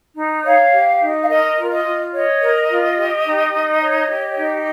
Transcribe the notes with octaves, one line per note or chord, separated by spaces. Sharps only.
D#4
C#5 F5
G4
D#4
F5
A#4 D#5
F4
D#5
F4
C#5 D#5
A#4
F4
G4
D#4
D#4
C#5
G4
D#4